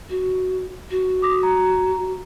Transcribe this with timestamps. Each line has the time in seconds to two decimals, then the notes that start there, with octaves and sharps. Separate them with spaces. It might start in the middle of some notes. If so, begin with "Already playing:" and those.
0.09 F#4
0.90 F#4
1.22 D6 D#6 A#6
1.43 A#5